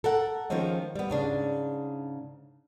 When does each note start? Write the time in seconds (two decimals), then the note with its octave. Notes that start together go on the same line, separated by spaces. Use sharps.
0.04 A4 A#4 F#5
0.50 D#3 F3 G#3 C4 C#4
0.95 G3 B3
1.10 G#2 C#3 D4